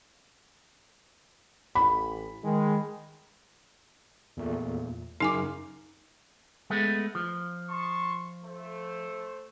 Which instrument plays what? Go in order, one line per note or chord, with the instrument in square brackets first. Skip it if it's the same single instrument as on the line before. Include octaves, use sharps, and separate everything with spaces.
[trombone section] A1 [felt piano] B5
[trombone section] D#3 G#3
[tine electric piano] E2 A#2 A3
[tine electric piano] F#2 C#3 A#4 [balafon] D#4 G#5 D6
[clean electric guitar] G#3 A3 B3
F3
[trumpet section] A5 C6 C#6
A3 C5